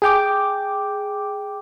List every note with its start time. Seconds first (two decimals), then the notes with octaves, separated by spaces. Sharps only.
0.02 G#4 G5 D6